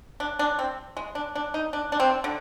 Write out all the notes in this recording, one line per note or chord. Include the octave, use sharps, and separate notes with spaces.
D4
D4
C4
G#3
D4
D4
D#4
D4
D4
C4
D3